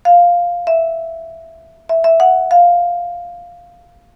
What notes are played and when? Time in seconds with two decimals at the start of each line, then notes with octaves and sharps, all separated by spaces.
0.05 F5
0.67 E5
1.89 E5
2.04 E5
2.20 F#5
2.51 F5